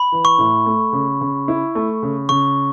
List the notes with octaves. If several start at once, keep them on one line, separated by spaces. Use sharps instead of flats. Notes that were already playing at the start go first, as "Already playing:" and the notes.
Already playing: B5
E3
C#6
A2
A3
C#3
C#3
E4
A3
C#3
C#3 C#6